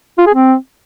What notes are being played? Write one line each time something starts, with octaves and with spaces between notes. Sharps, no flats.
F4
G#4
C4